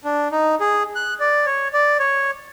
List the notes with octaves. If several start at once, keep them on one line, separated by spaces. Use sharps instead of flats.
D4
D#4
G#4
F#6
D5
C#5
D5
C#5